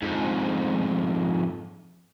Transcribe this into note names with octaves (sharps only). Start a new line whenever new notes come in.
F2 G#2